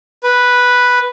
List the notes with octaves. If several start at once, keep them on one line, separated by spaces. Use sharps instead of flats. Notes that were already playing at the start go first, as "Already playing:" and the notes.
B4